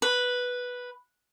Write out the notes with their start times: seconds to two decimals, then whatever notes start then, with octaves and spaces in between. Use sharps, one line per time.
0.02 B4